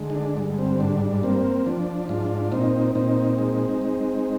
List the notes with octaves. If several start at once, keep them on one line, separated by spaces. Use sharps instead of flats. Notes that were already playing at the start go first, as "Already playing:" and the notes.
Already playing: D3 G#3
D#4
D4
G2
C4
G#2 D4
A#3 C4
F3 D4
G#2 D4 F4
A#2 C4 D#4
A#2 C4 D#4
G#3
G#3